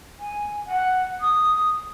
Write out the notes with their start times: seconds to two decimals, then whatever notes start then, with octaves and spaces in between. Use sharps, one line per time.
0.19 G#5
0.66 F#5
1.21 D#6